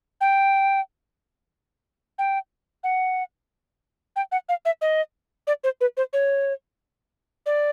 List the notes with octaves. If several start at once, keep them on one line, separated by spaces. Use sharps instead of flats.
G5
G5
F#5
G5
F#5
F5
E5
D#5
D5
C5
B4
C5
C#5
D5